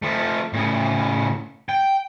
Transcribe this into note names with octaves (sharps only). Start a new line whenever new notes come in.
F3 A3
A2 C#3
G5